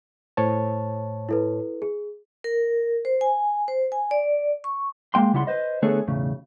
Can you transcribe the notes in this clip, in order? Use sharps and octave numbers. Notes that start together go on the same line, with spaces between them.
A2 C5 C#5 A5
E4 A4 B4
G#4
A#4
C5
G#5
C5
G#5
D5
C#6
G#3 A#3 G5 C6
C#2 C#3 G3 E4 F#5 C6
B4 C5 D#5
D3 A3 B3 G#4 A4 C#5
B1 E2 A2 C#3